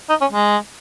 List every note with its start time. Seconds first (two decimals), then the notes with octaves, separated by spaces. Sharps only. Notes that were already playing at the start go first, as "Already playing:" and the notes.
0.09 D#4
0.21 C#4
0.33 G#3